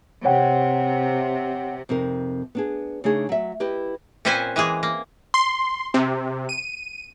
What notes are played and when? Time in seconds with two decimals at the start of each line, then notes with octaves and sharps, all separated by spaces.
0.25 C3 C#5 F#5 G5
1.89 F2 C3 D#4 A#4
2.55 B3 D4 G#4
3.04 C#3 A3 D4 D#4 G#4
3.29 F#3 E5
3.60 E4 G4 B4 D#5
4.25 A#2 C4 C#4 B4 C5 G#5
4.56 E3 G#3 A#3 G#4
4.83 A#3
5.34 C6
5.94 C3
6.49 D#7